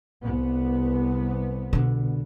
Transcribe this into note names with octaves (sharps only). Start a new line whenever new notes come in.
C2 B3
B2 D3